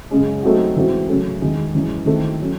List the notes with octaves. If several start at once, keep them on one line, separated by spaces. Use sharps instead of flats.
F#2 C#3 G#3 C#4
F#3 A3 C4 D#4 F#4
G#2 E3 A3 C4 F#4
C#3 F#3 A3 C#4
E2 D#3 G#3
F#2 E3 G#3
D#3 A3 C4 E4 A4
F#3 C#4